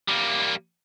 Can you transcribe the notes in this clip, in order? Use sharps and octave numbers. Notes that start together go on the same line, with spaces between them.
G3 A#3